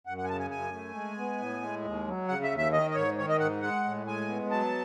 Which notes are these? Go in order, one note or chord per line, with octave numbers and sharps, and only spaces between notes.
F#2 F#5
F#5
G#5
C#3 A5
G#5
F#2 G#5
A3
G#3
B3
A2
G#3
D#2
F#3
C#3 F#5
E5
D#2
E5
D#3 D#5
D#5
G#2 C#5
D#3 C#5
D#5
G#2 F#5
G#3 F#5
A2
G#3 G#5
B3
F#3 A5